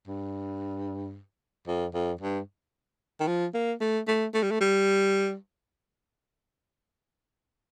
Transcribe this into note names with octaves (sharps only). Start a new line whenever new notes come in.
G2
F2
F2
G2
D#3
F3
A#3
A3
A3
A3
G3
A3
G3